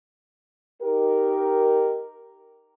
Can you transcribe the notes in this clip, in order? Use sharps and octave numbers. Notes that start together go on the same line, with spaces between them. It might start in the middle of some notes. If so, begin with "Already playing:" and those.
D#4 G4 A#4